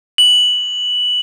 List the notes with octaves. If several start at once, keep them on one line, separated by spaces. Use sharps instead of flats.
F#7